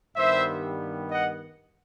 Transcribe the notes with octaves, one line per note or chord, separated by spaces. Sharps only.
G2 D#3 G3 B3 C5 E5
D#5 F#5